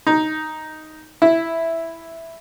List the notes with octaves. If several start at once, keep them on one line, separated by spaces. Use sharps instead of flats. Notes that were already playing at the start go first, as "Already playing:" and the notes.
D#4
E4